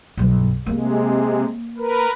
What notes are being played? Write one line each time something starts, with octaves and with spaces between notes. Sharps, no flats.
B1 G2
C3 G#3 A#3
A#4 B4